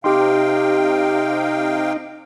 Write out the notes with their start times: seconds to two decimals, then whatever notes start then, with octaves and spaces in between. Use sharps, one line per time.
0.04 C3 D#4 G4 F5 G5 C6